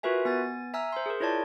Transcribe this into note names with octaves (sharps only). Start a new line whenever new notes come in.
F4 F#4 A#4 B4 E5 G#5
B3 G#5 A6
E5 G#5 A#5 E6 F6
C5 C6
G#4 A#4
E4 F4 C#5 D5 A5